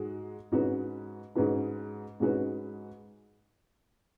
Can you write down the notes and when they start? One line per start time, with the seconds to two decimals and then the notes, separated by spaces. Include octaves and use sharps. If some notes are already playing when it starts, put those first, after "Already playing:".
Already playing: G#2 G#3 F#4
0.52 G#2 G#3 C#4 F#4 B4
1.35 G#2 G#3 C#4 F#4 B4
2.20 G#2 G#3 C#4 F#4 B4